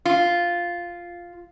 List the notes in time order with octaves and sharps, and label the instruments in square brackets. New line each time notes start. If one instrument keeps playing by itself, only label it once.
[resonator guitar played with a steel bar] F4